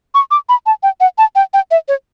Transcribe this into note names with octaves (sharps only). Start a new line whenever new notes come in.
C#6
D6
B5
A5
G5
F#5
A5
G5
G5
E5
C#5